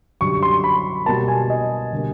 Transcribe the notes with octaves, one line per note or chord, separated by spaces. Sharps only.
F#2 D3 G3 C#6
C6
B5
B2 G3 A#3 A5
G#5
D#5
D3 G3 A#3